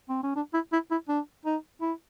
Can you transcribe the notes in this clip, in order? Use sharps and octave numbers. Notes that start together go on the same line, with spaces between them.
C4
C#4
D4
E4
E4
E4
D4
D#4
E4